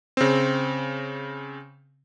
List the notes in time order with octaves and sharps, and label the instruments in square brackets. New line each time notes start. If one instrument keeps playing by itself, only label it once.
[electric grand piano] C#3 C4